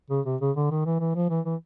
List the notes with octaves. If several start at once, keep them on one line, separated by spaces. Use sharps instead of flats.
C#3
C3
C#3
D3
D#3
E3
E3
F3
E3
E3